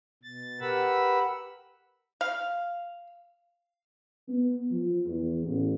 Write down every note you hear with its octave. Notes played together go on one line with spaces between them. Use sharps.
B2 A6
G4 A#4 B4 F#5 B5 E6
F5
B3
F3
E2
A1